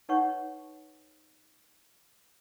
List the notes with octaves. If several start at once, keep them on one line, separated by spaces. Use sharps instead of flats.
D#4 B4 C#5 F#5 C#6